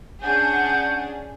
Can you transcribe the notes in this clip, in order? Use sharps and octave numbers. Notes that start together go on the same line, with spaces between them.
C#4 D4 G#4 F#5 G6